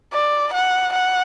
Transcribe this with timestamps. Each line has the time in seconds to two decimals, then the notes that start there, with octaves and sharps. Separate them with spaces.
0.13 D5
0.53 F#5
0.93 F#5